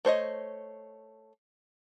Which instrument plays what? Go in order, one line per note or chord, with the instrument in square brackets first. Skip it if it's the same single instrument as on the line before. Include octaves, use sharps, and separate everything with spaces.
[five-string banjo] A3 C5 C#5 D#5